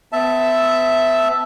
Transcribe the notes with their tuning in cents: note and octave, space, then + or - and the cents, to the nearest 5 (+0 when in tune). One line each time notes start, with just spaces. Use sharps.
B3 +40 E5 +0 A5 +0